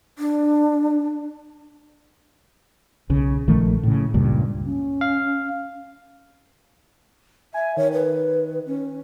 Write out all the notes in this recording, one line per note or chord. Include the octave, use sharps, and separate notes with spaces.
D4
B1 C#3
A#1 D#3 F3 A3
A2 C#3
C#2 G2 A#2
C#4
F5
E5 G#5
D#3 C#5
B4
C#4